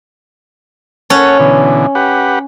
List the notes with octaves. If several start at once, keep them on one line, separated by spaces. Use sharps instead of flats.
C#4 A4 C#5 F#5
B2 D3 E3
G4 B4 F#5